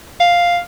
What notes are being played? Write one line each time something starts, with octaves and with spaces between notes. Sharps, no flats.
F5